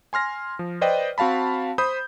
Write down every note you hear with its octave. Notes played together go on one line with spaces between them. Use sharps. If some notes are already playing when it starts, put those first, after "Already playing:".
G#5 C6 F6 A#6
F3
B4 C5 D5 D#5 G5
C4 F#4 F5 A5 B5
C5 B5 D#6 G6